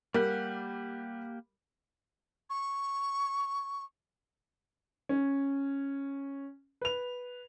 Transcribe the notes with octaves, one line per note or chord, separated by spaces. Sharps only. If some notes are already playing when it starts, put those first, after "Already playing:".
G3 A#3 G4 A#4 F#5
C#6
C#4
B4 F7